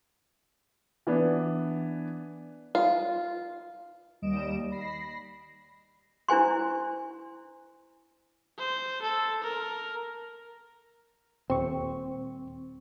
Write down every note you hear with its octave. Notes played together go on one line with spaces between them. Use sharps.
E3 B3 D4
F4
D#2 G3 D#5 D7 E7
B5 A#6 C7
D4 E4 C5 G#5 C6
C5
A4
A#4
D#1 C4 C#6